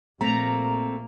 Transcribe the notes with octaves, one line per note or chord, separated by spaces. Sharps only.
A#1 A3 A#3 C4 A#5